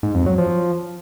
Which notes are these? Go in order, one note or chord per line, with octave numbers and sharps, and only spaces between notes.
G#2
F2
F#3
F3